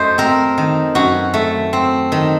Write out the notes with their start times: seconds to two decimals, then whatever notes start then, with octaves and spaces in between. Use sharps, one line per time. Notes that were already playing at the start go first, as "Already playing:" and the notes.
Already playing: F#2 A3 C5 D#5
0.18 C4 A#4
0.58 D#3
0.95 F#2 F#4
1.34 A3
1.73 C4
2.12 D#3